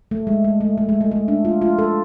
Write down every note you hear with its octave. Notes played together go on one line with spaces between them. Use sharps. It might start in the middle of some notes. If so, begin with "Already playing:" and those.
A3
G#3
G#3
A3
A3
G#3
A3
A3
D4
F4
F4
A4